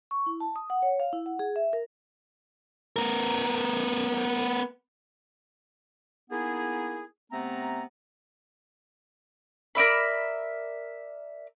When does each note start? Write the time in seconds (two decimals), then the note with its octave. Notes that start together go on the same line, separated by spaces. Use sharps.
0.11 C#6
0.26 E4
0.40 A5
0.56 D#6
0.70 F#5
0.82 C#5
1.00 F5
1.13 E4
1.26 F#5
1.39 G#4
1.56 E5
1.73 A#4
2.96 B3 A#4
6.30 A#3 B3 D#4 E4 G#4
7.32 C3 A3 B3 C4 A#5
9.75 A#4 D5 E5 B5